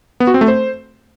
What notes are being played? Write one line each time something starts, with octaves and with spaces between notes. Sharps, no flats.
B3
F#4
C4
A3
C5